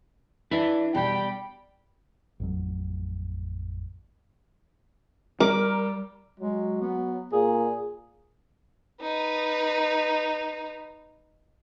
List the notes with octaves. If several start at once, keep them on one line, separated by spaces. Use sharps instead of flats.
D4 E4 B4 E5
B2 G3 G4 G5 B5
A1 F2 F#3
G3 A#4 D6
F#3 G#3
B3
A#2 G#4
D#4 B4